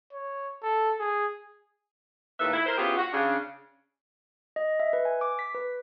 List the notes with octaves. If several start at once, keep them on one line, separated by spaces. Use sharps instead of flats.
C#5
A4
G#4
D#2 A2 F4 A4 B4 E5
E4
A#4 C5
B3 C#4 E4 F4 G4 G#4
F#4
C#3 D4
D#5
E5
B4
G#5
D6
B6
B4